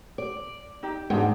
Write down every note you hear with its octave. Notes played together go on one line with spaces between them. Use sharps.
D5
D#4 G4
E2 G#2 D4 G5